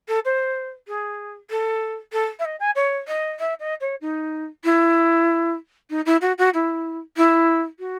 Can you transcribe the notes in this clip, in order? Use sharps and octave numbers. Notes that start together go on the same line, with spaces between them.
A4
C5
G#4
A4
A4
E5
D#5
G#5
C#5
D#5
E5
D#5
C#5
D#4
E4
D#4
E4
F#4
F#4
E4
E4
F#4